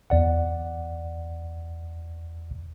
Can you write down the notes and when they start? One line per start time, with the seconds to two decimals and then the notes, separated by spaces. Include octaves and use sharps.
0.10 E2 D5 F#5